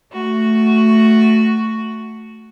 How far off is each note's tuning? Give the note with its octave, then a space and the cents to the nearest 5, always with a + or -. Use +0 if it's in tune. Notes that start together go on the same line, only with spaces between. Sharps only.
A3 +5 F#4 +0